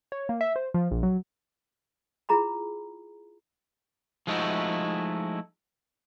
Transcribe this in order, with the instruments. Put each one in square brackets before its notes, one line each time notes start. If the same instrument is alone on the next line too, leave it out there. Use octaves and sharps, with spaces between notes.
[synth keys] C#5
A#3
E5
C5
F3
A#1
F#3
[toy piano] E4 F4 G#4 A#5 B5
[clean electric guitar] F3 G#3 A3 D#4 E4 F#4